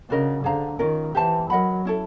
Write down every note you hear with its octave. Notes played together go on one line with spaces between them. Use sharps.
C#3 D4 F#4 A#4 D#5
D3 G#4 C5 F5 A#5
D#3 C#4 F4 A#4
E3 G4 C5 E5 A5
F#3 A#4 D#5 F#5 B5
C#4 E4 A4